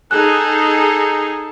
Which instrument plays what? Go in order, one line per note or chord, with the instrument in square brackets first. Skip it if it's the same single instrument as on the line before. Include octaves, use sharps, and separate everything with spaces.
[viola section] D#4 G#4 [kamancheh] A4 [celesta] F#6